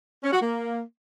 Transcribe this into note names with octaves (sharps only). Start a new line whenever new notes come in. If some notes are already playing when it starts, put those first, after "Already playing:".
C#4
F#4
A#3